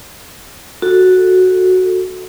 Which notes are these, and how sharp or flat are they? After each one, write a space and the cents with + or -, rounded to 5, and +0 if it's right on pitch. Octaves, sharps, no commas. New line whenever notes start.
F#4 +0 A4 +0